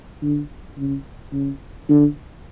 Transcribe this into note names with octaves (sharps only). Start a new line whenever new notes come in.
D3
C#3
C#3
D3